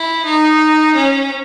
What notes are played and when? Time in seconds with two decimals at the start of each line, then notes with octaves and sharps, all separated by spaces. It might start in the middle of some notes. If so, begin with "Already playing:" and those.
Already playing: E4
0.25 D#4
0.95 C#4